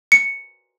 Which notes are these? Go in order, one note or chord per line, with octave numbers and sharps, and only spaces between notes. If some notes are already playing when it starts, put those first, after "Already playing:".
C#7